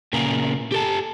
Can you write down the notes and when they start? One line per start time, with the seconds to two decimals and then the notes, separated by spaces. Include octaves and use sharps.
0.13 A#2 C#3 A#3 B3 G#4 A#4
0.72 G4 A4 A5